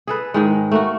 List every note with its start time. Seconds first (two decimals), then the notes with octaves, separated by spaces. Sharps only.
0.07 G#4 A4 B4
0.34 G#2 D#3 G#3
0.71 A3 A#3 F#4